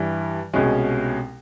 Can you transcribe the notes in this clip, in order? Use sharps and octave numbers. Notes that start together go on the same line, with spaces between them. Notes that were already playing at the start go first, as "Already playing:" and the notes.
Already playing: G2 E3 G3
C2 B2 G#3 C#4